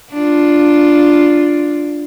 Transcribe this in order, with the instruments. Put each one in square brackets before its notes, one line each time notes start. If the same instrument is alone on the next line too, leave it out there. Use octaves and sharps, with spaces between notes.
[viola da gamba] D4 F4